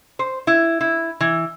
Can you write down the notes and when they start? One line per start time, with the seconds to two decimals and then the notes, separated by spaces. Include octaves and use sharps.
0.19 C5
0.47 E4
0.81 E4
1.21 E3